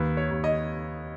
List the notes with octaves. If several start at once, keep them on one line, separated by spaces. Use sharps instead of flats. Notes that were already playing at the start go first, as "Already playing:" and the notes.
Already playing: D#2 B4
C#5
D#2
D#5